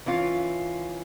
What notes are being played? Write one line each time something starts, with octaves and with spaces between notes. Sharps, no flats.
E3 C#4 F4